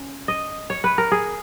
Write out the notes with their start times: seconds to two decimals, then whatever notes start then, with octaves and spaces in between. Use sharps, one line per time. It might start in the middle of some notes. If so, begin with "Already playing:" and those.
Already playing: C#4
0.28 D#5
0.70 C#5
0.84 B4
0.98 A#4
1.12 G#4